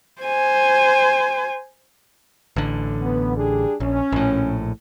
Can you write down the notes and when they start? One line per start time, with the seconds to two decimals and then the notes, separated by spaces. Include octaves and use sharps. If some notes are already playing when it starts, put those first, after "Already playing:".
0.22 C5 G#5
2.56 A1 D3
3.00 B3
3.36 G3 D4 G#4
3.80 A#1 C#4
4.12 A#1 A2